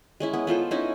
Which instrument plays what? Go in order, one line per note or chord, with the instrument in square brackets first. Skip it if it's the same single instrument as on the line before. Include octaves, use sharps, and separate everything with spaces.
[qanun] G#3 C#4 E4
B3
B3 F4 A4 C5
C#4 D#4 E4